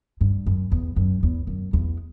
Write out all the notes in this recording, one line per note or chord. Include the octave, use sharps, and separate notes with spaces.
G2
F#2
E2
F#2
E2
F#2
E2